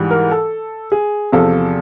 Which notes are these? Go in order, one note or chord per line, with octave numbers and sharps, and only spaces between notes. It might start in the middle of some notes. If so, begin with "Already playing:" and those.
Already playing: G#2 E3 G3
A#4
A4
G#4
E2 C3 F3 A4